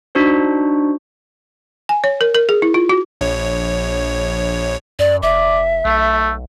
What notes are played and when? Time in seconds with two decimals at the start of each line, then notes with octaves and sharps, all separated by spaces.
0.15 D4 D#4 F#4 C5
1.89 G#5
2.04 C#5
2.21 A#4
2.34 A#4
2.49 G#4
2.62 E4
2.74 F4
2.89 F#4
3.21 A#1 C#5
4.99 F#2 D5
5.23 F1 D5 E5
5.85 B1 A3